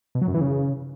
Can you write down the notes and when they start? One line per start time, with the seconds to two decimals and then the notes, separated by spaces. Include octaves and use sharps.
0.15 B2
0.21 F#3
0.28 F#2
0.34 E3
0.41 C#3